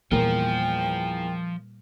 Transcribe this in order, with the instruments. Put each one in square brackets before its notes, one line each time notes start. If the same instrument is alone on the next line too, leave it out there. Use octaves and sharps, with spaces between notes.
[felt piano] E2 A#3 A#4 [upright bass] A#2 G3 [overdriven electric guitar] F3 [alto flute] G5